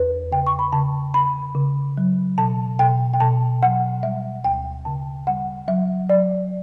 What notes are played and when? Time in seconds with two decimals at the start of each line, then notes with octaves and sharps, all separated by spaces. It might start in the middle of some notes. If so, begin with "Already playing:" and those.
Already playing: E2 B4
0.32 C#3 G5
0.47 C#6
0.59 B5
0.73 C#3 A5
1.14 C#3 B5
1.55 C#3
1.98 F#3
2.38 B2 A5
2.79 B2 G5
3.14 G5
3.20 B2 A5
3.63 F#3 F#5
4.03 G3 E5
4.44 D2 G5
4.85 C#3 A5
5.27 G3 F#5
5.68 F#3 E5
6.09 F#3 D5